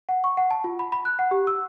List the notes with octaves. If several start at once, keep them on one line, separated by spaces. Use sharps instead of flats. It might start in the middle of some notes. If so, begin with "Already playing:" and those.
F#5
C#6
F#5
A5
F4
B5
B5
F#6
F#5
G4
E6